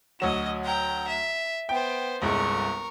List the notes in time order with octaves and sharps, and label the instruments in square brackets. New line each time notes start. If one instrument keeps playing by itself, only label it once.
[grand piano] D2 F#3 E7 [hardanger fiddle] F#4 D#5
[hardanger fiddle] G5 A#5
E5
[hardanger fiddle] B3 C5 [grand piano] G5
[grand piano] G1 C2 G#3 [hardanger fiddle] A#4 C#6